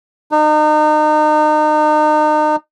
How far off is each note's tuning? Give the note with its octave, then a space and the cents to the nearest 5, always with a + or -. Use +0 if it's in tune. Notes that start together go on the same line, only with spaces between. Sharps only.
D#4 -35